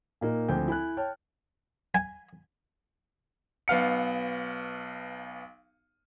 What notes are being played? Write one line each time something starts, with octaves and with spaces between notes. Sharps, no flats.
A#2 A#3 D#4
D2 F3 C4 G5 G#5 G6
E4 G#5 F#6
C#5 G5 A5 F6
G#5
B1 B3 F5 C#7